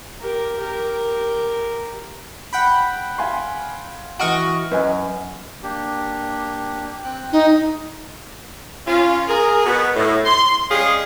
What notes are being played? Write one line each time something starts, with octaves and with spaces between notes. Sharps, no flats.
G4 A#4
G4 A#4
F#5 G5 B5
F5 G#5 C6
E3 F#4 D#5 C#6 F6 D7
F#2 B4 D#5 G#5
A#3 D4 G4
C4 G5 F#6
D#4
C#4 F4
G#4 A#4
B2 B3
A2
C6
G3 G#3 C#4 G4 G#4 F5